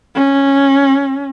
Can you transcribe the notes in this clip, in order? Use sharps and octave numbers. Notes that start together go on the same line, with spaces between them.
C#4